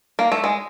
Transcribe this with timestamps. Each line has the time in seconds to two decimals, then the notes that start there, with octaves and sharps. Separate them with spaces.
0.19 A#3
0.32 A3
0.44 G#3